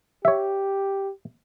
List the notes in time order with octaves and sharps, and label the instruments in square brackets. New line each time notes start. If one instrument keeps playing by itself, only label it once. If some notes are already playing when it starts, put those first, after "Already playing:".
[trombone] G4 [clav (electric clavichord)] C#5 E5